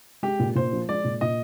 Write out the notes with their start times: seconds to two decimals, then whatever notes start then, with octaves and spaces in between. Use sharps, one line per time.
0.23 G#3 G4
0.40 A#2
0.55 A#2 C5
0.72 F3
0.89 G#3 D5
1.04 A#2
1.21 A#2 D#5